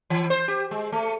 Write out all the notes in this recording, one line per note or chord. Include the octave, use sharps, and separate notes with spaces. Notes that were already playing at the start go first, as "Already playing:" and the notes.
E3
C5
G4
G#3
A3